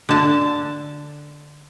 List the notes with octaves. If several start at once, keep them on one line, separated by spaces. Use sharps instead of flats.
D3 A5